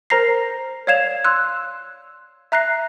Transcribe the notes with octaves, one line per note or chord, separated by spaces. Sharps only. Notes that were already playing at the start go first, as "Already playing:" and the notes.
A#4 C5 A#5 A#6 C7
C#5 D5 F5 G#6 E7 F7
C6 E6 F#6
E5 A#5 F#6 A#6 C7